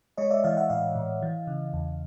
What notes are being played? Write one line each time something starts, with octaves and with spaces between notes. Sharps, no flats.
G#3 C#5 D#5
D5 E5
E3 D#5 F5
E5 F#5
A2 D#5 F5
A2
E3
C#3
E2